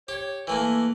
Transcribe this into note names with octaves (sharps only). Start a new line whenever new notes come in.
G4 C#5
E3 A3 A#3 G#5